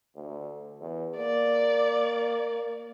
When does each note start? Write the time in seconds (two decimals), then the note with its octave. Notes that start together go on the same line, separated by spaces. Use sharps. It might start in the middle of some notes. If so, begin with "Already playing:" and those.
0.16 D2
0.81 E2
1.17 A#3 D5